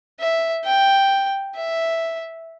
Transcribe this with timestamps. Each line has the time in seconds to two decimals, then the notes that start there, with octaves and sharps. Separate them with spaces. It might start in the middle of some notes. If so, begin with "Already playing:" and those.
0.20 E5
0.65 G5
1.56 E5